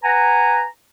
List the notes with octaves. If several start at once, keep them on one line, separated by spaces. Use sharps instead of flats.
B4 F#5 G#5 A#5